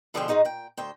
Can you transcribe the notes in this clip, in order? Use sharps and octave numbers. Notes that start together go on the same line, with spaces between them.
B2 D3 F3 G#4 C5 G5
G#2 B2 G#3 D#4 F#4
A#2 G5
D2 C5 G5